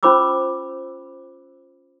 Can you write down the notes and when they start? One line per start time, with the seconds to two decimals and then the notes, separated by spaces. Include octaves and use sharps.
0.03 C#4 F4 C5 B5 D6 E6